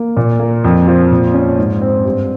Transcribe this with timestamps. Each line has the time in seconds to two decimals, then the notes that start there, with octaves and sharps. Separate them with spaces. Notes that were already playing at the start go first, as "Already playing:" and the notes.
Already playing: A#3
0.17 A#2
0.40 A#3
0.64 F2
0.87 F3
1.11 A#2
1.34 C#4
1.59 G#2
1.82 C4
2.05 G2